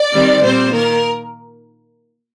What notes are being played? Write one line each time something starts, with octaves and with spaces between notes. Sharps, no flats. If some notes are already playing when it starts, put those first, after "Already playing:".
Already playing: D5
D#3 G3 C4
A#2 G3 C4 C5
D#3 A#3 A#4